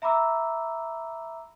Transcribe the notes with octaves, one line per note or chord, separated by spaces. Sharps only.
E5 A#5 B5 D6 E6